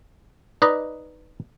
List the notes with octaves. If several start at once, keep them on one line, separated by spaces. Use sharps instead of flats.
D#4 B4 D5 D#5